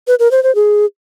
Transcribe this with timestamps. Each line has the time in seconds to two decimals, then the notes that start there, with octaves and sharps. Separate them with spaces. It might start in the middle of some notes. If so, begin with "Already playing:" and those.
0.07 B4
0.19 A#4
0.31 C5
0.43 C5
0.55 G#4